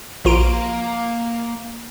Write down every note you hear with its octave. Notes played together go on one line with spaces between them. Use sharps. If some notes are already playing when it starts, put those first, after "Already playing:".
A#1 A#3 F4 A#5 D7